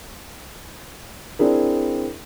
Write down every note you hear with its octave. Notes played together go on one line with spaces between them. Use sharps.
C4 D4 E4 G#4 A#4